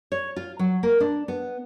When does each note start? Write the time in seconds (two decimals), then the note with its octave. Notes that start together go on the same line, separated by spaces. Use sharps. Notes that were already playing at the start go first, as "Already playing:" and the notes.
0.12 C#5
0.36 F4
0.59 F#3
0.83 A#3
1.00 D4
1.28 B3